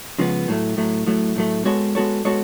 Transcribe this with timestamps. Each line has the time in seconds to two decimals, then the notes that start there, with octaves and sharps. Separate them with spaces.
0.19 C#3 F3 G#3 B3
0.48 A2 F#3 A3
0.77 A2 F#3 A3
1.07 A2 F#3 A3
1.36 A2 F#3 A3
1.65 G#3 B3 F#4 A4 C#5
1.95 G#3 B3 F#4 A4 C#5
2.25 G#3 B3 F#4 A4 C#5